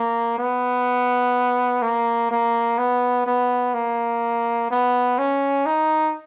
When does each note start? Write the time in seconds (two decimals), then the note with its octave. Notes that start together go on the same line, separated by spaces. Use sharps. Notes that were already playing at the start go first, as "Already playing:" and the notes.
Already playing: A#3
0.38 B3
1.82 A#3
2.31 A#3
2.78 B3
3.26 B3
3.74 A#3
4.71 B3
5.18 C#4
5.66 D#4